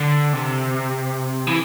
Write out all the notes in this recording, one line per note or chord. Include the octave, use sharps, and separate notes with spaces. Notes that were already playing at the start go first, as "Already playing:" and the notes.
Already playing: D3
C3
E3